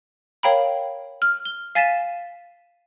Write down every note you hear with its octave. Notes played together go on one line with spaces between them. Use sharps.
A#4 C#5 F5 G5 A#5 B5
F6
G7
F5 G#5 A6 B6 D#7 E7